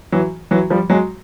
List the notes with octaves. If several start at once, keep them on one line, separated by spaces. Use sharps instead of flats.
E3 F#3
E3 F#3
F3 G3
F#3 G#3